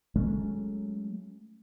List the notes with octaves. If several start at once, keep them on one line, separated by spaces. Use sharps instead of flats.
F#3 G#3 A3 C#4